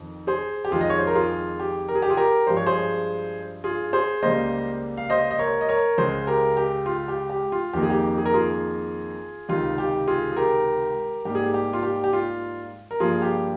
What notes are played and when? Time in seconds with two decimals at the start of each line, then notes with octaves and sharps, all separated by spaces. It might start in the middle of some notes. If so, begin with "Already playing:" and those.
Already playing: F2 D#3
0.27 G#4 C5
0.65 G4
0.71 F2 D#3 G#3 F4 G#4
0.81 D#5
0.90 C#5
0.99 C5
1.07 A#4
1.15 F4 G#4
1.60 G4
1.89 A#4
1.95 G#4
2.02 G4
2.10 F4 G#4
2.17 G4 A#4
2.47 G2 F3 G#3 C5
2.57 C#5
2.66 G#4 C5
3.64 F4 G#4
3.93 G#4 C5
4.23 C#2 C#3 G3 A#3 C5 D#5
4.97 F5
5.10 C5 D#5
5.31 D#5
5.39 A#4 C#5
5.61 D#5
5.69 A#4 C#5
5.98 C#2 C#3 G#3 G#4 C5
6.27 G4 A#4
6.57 G4
6.86 F4
7.08 G4
7.30 G4
7.52 F4
7.73 F2 D#3 A#3 G4
7.82 G#4
7.90 G4
8.18 G#4
8.26 A#4
8.34 F4 G#4
9.49 C#2 C3 D#3 F4
9.78 G4
10.08 F4 G#4
10.32 G#4
10.37 G4 A#4
11.25 G#2 G3 A#3 G4
11.35 G#4
11.44 G4
11.54 G4
11.73 F4
11.83 G4
12.04 G4
12.13 F4
12.91 A#4
13.00 G2 F3 A#3 F4 G#4
13.22 G4